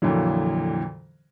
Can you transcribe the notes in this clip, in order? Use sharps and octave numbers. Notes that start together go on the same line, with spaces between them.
F2 A#2 D3 E3 F#3